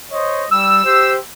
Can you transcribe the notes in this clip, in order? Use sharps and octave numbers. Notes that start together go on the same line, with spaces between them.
C5 C#5 D#5
G3 E6
G4 C5